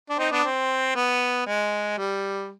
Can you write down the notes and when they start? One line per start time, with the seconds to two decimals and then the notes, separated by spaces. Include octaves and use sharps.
0.10 D4
0.18 C4 D#4
0.31 B3 D4
0.45 C4
0.96 B3
1.47 G#3
1.98 G3